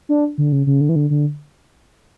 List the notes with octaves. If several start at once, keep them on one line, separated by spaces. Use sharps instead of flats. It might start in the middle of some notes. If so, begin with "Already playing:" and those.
D4
D3
C#3
C#3
D3
E3
D3
D3